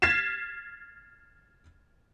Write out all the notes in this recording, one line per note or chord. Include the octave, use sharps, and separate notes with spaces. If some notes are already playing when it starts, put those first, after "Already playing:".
F6 G#6 A6 B6 C7 E7